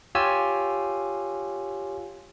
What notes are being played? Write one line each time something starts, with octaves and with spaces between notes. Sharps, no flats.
F4 G4 C#5 G#5 E6